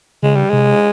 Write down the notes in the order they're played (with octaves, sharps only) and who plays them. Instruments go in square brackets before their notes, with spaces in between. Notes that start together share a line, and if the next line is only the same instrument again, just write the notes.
[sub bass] C#3 [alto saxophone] G#3
[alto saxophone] G3
[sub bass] C3 [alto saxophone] G#3